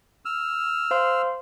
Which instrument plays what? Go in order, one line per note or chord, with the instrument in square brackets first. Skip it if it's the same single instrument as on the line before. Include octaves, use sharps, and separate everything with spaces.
[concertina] E6 F6
[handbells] C5 F5 C6